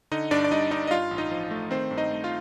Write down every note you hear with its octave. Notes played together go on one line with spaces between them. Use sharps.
D3 D#4 D#5
G2 D4 D5
D5
G3 D#4 D#5
G2 D#4 D#5
D#5
G2 F4 F5
A1
D#4 D#5
F3
A3
D#3 C4 C5
G2
D#4 D#5
A3
F4 F5